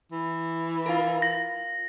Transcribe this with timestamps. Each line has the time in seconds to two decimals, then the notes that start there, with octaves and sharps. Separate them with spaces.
0.12 E3
0.86 F4 A#4
1.22 A#6